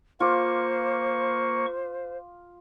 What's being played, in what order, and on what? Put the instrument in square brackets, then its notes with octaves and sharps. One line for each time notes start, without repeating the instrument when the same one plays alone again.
[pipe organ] A#3 C#6 [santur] F4 D6 [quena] C5